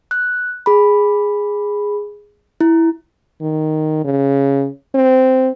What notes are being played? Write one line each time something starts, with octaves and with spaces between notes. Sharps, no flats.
F#6
G#4 B5
E4
D#3
C#3
C4